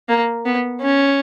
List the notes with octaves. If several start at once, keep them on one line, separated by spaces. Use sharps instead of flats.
A#3
B3
C#4